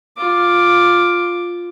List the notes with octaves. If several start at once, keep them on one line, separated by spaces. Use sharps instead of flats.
F4 D6